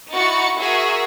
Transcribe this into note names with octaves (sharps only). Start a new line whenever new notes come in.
D#4 E4 F#4 A6 C#7
F#4 G#4 A#4 E5